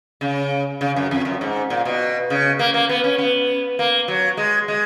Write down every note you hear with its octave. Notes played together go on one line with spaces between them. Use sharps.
C#3
C#3
F#2
F2
F#2
G#2
A#2
B2
C#3
A#3
A#3
B3
C#4
B3
A#3
F#3
G#3
G#3